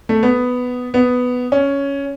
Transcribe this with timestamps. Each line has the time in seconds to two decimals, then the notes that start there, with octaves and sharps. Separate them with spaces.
0.09 A3
0.23 B3
0.94 B3
1.52 C#4